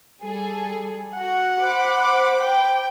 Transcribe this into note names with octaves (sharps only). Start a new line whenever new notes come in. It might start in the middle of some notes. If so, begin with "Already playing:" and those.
G3 G#4 A4
F#4 F#5
C5 B5 D6
G5